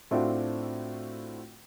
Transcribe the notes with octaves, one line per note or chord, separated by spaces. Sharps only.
A2 A3 C4 D4 F4 F#4